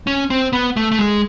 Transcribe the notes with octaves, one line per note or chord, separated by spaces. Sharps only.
C#4
C4
B3
A3
A3
G#3